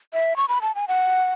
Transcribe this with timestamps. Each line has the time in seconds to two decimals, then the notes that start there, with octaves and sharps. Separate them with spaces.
0.14 E5
0.37 C#6
0.48 B5
0.62 A5
0.75 G#5
0.88 F#5